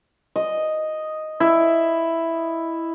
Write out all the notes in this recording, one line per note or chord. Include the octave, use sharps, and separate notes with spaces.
D#5
E4